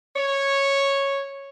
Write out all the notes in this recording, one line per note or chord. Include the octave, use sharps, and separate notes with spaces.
C#5